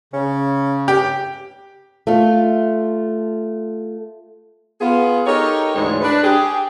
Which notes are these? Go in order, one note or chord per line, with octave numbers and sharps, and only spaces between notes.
C#3 C#4
G4
A3 F4
B3 F4 G#4
D#4 G4 A4 A#4 C#5
D2 G#2 D3 E3 G#3 C#5
D4 B4
G4 G#4